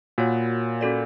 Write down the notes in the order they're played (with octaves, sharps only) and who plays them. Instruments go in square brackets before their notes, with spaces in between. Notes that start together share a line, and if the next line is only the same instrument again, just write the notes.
[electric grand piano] A#2 [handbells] F#4 A#4 C#5 F#5
[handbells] C#4 F#4 A4 D5